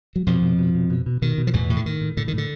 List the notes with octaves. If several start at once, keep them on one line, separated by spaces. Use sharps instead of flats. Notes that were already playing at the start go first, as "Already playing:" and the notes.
F#3
F2 B2 F3
B2
B2
B2
B2
B2
B2 D#3
B2
F3
E2 A2 E3
A2
D3
A2 D#3
A2
A2 D3
D#3
A2 D3